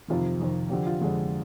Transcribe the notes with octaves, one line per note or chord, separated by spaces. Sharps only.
F2 C3 D#3 F4
F2 C3 D#3
F2 D3 G4
F4
F2 D3 G#3